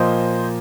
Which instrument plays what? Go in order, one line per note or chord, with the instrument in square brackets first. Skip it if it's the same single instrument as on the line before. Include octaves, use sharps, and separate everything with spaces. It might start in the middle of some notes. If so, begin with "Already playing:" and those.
Already playing: [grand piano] A#2 F3 A#3 [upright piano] C5 D#5